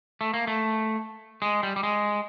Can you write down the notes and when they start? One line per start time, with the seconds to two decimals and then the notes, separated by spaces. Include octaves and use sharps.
0.21 A3
0.34 A#3
0.47 A3
1.42 G#3
1.63 G3
1.76 G3
1.83 G#3